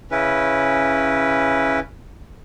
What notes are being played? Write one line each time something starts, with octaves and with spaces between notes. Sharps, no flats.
C#3 C#4 E4 B4